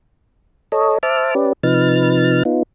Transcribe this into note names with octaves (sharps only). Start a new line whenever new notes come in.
A4 C#5 D#5
C5 E5 A5 D6 F6
C#4 G4 B4 D5
C3 F3 D#4 B4 F6 A6
B3 D#4 F4